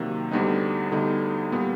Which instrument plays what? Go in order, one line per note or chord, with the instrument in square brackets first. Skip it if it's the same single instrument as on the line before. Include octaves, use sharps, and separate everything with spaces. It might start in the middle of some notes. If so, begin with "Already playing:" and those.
Already playing: [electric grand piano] C3 D#3 F#3 A#3
D2 D3 G3 B3 D#4
D2 D3 G3 B3 D#4
A#2 G3 B3